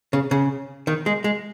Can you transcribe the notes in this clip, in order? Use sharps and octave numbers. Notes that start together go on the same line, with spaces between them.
C#3
C#3
D#3
G#3
G#3